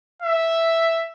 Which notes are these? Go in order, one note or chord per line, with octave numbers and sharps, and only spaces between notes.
E5